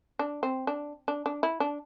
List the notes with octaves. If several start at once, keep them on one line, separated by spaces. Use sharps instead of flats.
D4
C4
D4
D4
D4
E4
D4